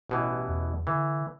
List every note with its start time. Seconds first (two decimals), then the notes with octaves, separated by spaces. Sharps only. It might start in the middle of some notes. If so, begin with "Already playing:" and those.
0.09 A1 B2 E3
0.48 E2
0.87 D3 E3